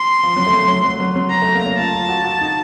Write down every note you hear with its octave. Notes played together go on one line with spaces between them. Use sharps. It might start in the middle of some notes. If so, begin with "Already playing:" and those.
Already playing: C6
F3
F#3
A3
F#3
F#3
F#3
F#3
F#3
A#5
A3
A#3
C#4
F4 A5
F4
F#4
F#4
D#4